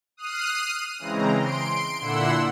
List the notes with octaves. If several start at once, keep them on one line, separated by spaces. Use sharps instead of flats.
D#6 F6 F#6 C7 D#7
C#3 E3 G#3 C4 A#5
C6 D7
A#2 D3 E4 F#5 C6 E6